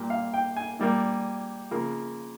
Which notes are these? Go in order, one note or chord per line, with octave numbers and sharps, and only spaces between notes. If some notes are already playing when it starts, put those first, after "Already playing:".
Already playing: A#2 G3 A#3
F5
G5
G#5
A#2 G3 A#3
C#3 F3 A#3